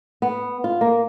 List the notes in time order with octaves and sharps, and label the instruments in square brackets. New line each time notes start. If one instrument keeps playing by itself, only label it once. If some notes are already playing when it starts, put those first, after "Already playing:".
[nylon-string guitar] B3
F4
A#3